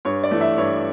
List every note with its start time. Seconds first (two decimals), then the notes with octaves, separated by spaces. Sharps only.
0.05 G2 C#5
0.24 D5
0.31 E3 A3
0.41 E5
0.58 G2 C#5